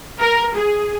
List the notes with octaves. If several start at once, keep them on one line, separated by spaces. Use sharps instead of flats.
A#4
G#4